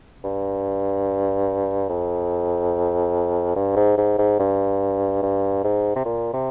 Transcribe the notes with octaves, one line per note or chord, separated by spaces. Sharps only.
G2
F2
G2
G#2
G#2
G#2
G2
G2
G#2
C3
A#2
C3